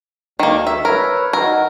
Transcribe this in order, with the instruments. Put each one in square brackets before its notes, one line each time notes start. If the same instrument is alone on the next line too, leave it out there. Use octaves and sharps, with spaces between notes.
[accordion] D2 [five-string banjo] D#3 A#3
[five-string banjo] E5
[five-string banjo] A#4 [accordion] B4 C#5 E5
[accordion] D#3 F#4 [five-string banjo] A#4